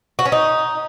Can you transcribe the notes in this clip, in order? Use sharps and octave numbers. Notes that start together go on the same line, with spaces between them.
F#4
C#4
D#4